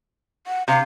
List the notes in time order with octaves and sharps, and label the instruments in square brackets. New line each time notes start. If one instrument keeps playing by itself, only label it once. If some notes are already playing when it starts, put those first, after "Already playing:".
[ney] F#5
[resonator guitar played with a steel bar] C3 [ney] F5